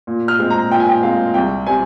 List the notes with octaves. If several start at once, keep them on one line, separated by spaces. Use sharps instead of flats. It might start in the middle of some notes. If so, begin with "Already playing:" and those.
A#2
F6
G#3 C4
A#5
A#2 G5
G#5
G5
G#3 C4 F5
C2 G5
C3 G3 C4 G#5